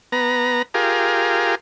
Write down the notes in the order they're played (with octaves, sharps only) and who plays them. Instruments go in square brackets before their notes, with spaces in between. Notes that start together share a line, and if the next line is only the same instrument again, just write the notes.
[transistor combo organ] B3 A#5
F4 G4 G#4 A#4